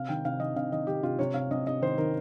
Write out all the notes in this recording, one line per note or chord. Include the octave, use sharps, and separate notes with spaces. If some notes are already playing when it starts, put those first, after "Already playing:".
Already playing: C3 F5
D#3 G5
C3 F5
D#3 D#5
C3 F5
D#3 D#5
D#3 G4
C3 F4
C3 C#5
C3 F5
C3 D#5
C3 D#5
D#3 C5
D#3 A#4